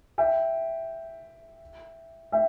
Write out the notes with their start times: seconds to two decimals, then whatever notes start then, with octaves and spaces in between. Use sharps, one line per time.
0.18 E5 G5
2.32 E5 G5